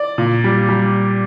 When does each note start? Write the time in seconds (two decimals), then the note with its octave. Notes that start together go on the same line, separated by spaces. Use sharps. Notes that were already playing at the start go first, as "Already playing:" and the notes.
Already playing: D5
0.18 A#2
0.44 G3
0.69 G3